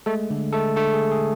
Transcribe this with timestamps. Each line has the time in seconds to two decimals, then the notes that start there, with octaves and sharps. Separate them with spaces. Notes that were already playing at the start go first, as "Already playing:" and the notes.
0.06 G#3 A3 A4
0.30 D3
0.53 G#3 A3 A4
0.76 D3 A3 A4
0.93 G#4
1.00 G#3
1.11 G#4